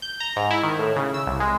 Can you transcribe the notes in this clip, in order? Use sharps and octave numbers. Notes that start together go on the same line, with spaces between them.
G6
A#5
G#2
E4
D#3
A2
C#3
E6
C2
G#3